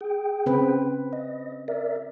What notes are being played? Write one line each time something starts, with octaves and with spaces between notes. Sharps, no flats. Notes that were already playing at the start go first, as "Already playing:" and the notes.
G#4 G5
C#3 C4 B4
D#5
A#4 D5 E5